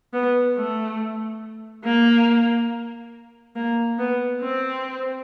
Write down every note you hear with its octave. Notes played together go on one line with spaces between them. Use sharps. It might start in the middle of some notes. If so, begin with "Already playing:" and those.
B3
A3
A#3
A#3
B3
C4